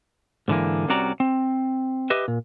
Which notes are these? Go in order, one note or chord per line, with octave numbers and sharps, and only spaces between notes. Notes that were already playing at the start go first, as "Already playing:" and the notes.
G#2 D3 E3 A#3
C2 C3 C#4 F#4 D5 A#5
C4
G4 B4 D#5 E5
A#2